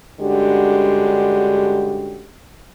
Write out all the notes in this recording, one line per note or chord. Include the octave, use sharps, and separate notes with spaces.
G2 D3 G#3 C#4 F#4 G4